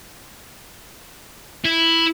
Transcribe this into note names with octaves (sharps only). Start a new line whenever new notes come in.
E4